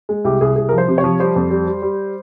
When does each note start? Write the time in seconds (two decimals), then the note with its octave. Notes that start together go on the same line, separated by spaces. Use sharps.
0.09 G#3
0.25 C2 G4
0.41 C2 G#4
0.56 C2 G#4
0.69 A#4
0.72 F3
0.78 C5
0.88 C3
0.98 C#5
1.04 F3
1.20 G3 C5
1.36 F2
1.51 G3
1.67 G3
1.82 G3